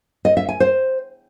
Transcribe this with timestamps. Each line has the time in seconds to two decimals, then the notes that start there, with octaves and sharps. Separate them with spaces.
0.25 D#5
0.37 E5
0.49 G#5
0.60 C5